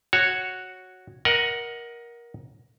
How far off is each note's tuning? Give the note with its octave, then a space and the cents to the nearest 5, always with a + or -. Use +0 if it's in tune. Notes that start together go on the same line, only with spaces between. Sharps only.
F#4 +0 C#5 -5
A#4 +20 D#5 +0 F#5 +0